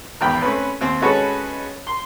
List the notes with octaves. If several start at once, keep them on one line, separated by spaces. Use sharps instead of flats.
G#1 E2 G5 B5
A3 C4 C#4 B4
D#2 C4
G#3 C#4 F#4 A4 B4 C#5
C6